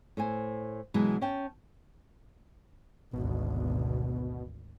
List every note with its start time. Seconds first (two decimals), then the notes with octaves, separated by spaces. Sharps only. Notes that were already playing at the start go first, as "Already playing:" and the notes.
0.17 A2 C5 G#5
0.94 B2 E3 F#3 G#3
1.21 C#4 G5 A5
3.13 G#1 D2 B2